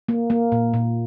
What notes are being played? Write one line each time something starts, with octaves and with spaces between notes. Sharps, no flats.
A#3
A#3
A#2
A#2